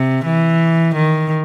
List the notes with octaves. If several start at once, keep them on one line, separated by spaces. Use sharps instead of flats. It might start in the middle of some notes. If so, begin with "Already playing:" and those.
Already playing: C3
E3
D#3